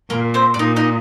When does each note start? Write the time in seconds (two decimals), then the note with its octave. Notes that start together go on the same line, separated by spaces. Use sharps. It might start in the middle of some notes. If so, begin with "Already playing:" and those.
0.10 A#2 A#3 A#4
0.34 C4 C5
0.54 D5
0.59 A#2 D#4 D#5
0.76 D#4 D#5